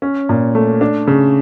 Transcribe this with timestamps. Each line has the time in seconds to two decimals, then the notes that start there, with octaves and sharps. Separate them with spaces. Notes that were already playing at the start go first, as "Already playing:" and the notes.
0.02 C#4
0.29 A#2
0.55 A3
0.81 D4
1.07 C#3